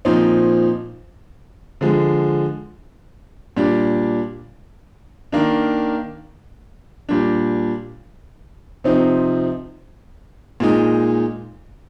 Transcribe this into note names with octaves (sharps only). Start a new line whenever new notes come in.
A#2 F3 C4 D#4
D3 F3 G#3
A#2 G3 D4
D#3 A#3 D4
A#2 G3 D4
C3 F3 C4 D#4
A#2 G#3 D#4